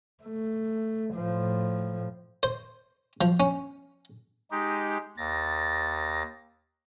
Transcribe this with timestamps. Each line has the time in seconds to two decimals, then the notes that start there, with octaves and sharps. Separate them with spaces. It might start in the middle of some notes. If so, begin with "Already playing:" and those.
0.23 A3
1.15 A2 F3
2.43 C5
3.21 F3
3.40 C#4
4.51 G#3 D#4 G4
5.17 D#2 A6 A#6